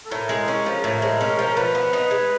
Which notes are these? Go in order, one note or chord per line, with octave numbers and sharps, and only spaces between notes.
A4
A2 A#4
G#3
C#4
F3
A2
G#3
C#4
F3
A#4
F3 B4
B3
D#4
G#3